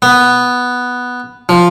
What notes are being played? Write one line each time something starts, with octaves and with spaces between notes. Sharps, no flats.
B3
F3